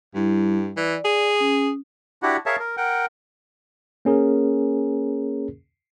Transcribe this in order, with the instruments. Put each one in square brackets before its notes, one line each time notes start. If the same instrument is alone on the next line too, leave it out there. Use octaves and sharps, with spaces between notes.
[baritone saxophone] G2 [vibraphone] G3 E4
[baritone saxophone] E3 [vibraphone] D5
[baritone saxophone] G#4
[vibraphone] C#4 D#6
[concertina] D4 E4 F#4 G4 F#5
G#4 A#4 C#5 E5 F5 A5
A#4
A#4 F#5 G5
[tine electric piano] A#3 C#4 G#4 A#4